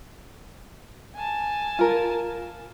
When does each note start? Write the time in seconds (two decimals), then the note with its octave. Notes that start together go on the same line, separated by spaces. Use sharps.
1.15 G#5 A5
1.79 F4 A#4